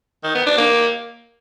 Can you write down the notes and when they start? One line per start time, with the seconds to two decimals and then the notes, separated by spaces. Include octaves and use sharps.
0.23 D#3
0.35 B3
0.46 D4
0.58 A#3